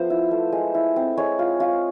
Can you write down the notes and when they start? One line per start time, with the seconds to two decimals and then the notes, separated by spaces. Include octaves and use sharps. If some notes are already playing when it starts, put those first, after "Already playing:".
Already playing: F3 A3 B3 C5
0.10 E4
0.31 A3
0.52 G#3
0.74 E4
0.96 C4
1.17 G#3 C#5
1.39 F4
1.60 F4